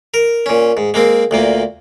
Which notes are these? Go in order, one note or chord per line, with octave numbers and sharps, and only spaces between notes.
A#4
A#2 C#4
G#2
G#3 A#3 C4
D2 A#2 A#3